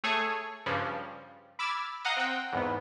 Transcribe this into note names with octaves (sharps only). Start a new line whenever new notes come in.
A3 G#4 A4 C#5 G#5 C#6
G2 C#3 F3 G3
B5 D6 E6 F6 G#6 A6
D#5 F5 F#5 A#5 D#6 G6
C4 F#5 G5
E2 G#2 B3